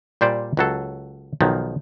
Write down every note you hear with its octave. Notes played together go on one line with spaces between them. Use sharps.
A#2 G3 C5 D5
C#2 F#3 A4
B1 D#3 F3